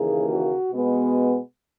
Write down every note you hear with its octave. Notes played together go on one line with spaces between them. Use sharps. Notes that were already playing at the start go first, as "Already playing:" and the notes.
Already playing: D#2 C#3 E3 A#3 G#4
F#4
B2 G#3 B3